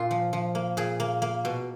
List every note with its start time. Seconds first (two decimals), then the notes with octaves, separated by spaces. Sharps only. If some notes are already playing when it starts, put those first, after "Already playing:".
Already playing: A#2 A#3 F4
0.11 F3
0.33 F3
0.55 A#3
0.77 A#2 G#4
1.00 A#3
1.22 A#3
1.45 B2